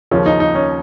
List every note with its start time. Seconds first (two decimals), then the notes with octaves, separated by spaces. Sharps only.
0.11 D#2 C#3 F3 C#4
0.26 D#4
0.40 D#4
0.55 C#4